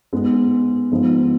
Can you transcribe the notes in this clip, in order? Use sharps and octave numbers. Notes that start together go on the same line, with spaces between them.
G#2 G#3 B3
G#2 F3 G#3 B3